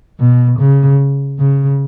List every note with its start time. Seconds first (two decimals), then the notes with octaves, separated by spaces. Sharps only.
0.20 B2
0.60 C#3
1.39 C#3